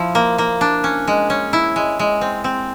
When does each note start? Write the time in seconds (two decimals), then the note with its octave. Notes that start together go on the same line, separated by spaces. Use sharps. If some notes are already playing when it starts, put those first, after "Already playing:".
Already playing: F3 E4
0.15 A#3
0.38 A#3
0.61 D4
0.84 C#4
1.08 G#3
1.30 C#4
1.53 E4
1.76 G#3
1.99 G#3
2.21 C4
2.44 C4